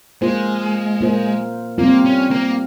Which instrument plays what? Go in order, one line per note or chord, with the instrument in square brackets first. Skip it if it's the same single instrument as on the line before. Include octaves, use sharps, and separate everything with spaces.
[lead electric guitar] G#3 [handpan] A#3 F4 C5
[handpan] A#3 F4 C5
[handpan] G3 C4 F4 [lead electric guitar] A#3
[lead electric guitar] C#4
A#3